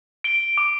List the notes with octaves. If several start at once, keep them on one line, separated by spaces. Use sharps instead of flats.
D7 G7
D6